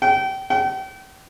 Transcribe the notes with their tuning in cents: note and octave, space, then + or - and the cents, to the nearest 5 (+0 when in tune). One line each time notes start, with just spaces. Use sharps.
G5 -30
G5 -40